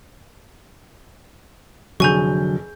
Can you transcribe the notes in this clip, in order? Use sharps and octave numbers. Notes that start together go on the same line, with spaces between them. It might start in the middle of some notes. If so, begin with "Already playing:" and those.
F1 D3 F#3 G#4 G#5 C#6 G6